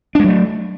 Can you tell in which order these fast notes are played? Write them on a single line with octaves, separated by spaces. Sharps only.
D4 G#3 F#3 A3